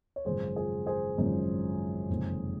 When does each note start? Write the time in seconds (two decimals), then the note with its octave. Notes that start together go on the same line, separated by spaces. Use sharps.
0.16 C#5
0.25 G#1 F#2 C#3 F3 G#4 C5
0.56 F4 G#4
0.86 G#4 C5
1.18 G#1 F#2 C#3 F3
2.10 F#1 F2 C3 D#3 G#3